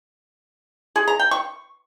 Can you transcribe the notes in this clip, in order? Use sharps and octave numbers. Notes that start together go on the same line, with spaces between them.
G#4
A#5
G5
C#6